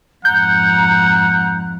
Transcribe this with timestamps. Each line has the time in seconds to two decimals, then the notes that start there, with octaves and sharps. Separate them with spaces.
0.25 F2 G#2 F#5 A#5 G6